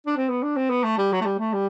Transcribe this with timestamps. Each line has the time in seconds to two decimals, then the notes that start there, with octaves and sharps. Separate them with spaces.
0.07 D4
0.16 C4
0.30 B3
0.43 D4
0.56 C4
0.70 B3
0.84 A3
0.98 G3
1.13 F#3
1.21 A3
1.26 G3
1.39 A3
1.54 G3